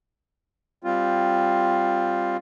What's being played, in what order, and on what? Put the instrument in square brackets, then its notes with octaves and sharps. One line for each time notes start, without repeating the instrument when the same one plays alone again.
[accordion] G3 C4 F4